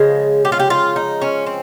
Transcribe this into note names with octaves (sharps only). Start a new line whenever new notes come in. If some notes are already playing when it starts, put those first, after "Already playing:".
Already playing: C#3 F3 G#3 G#4
G4
F4
G4
F4
D#4
C#4
C4